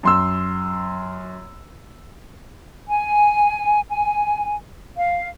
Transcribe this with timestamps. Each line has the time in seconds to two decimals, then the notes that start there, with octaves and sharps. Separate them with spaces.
0.03 F#2 C6 E6
2.88 G#5
3.89 G#5
4.96 F5